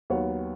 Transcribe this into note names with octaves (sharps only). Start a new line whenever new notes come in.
D#2 D#3 F#3 B3 C#5